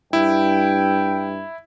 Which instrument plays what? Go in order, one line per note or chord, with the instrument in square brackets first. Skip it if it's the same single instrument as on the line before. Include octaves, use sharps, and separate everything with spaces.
[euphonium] G2 [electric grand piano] E4 [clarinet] G5